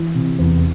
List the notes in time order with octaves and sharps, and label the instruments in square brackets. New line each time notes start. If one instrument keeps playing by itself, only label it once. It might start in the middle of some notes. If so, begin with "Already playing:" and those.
Already playing: [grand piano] E3
C3
E2